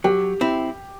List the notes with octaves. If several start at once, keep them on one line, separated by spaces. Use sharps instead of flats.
F#3 G4
C4 E4